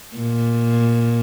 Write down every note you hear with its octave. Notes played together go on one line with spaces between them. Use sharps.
A#2